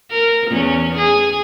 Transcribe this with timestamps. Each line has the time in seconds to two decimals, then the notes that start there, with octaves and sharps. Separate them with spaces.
0.11 A#4
0.50 E2 C#4
0.98 G#4